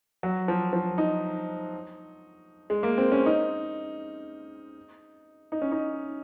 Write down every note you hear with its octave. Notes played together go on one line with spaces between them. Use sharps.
F#3
F3
F3
D#4
G#3
A#3
C4
C#4
D#4
D#4
C#4
D#4